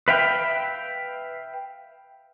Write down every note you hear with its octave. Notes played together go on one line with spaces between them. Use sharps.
B4 E5 F5 G5